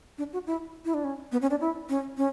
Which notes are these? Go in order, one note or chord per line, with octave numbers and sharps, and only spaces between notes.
D4
F#4
E4
E4
D4
C#4
B3
C#4
D4
E4
C#4
C#4